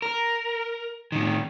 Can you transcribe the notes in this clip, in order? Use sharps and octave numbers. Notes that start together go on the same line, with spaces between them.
A#4
A2 D#3